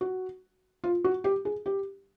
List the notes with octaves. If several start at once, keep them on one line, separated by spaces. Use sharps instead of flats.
F#4
F4
F#4
G4
G#4
G4